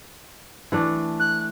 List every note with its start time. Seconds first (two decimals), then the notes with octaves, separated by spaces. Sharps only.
0.72 E3 A3 D4
1.20 F#6